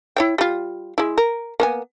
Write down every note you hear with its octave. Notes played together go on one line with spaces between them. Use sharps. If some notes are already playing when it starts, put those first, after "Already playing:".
E4 C#5 G5
G3 F4
G#3 E4
A#4
A#3 B3 G#5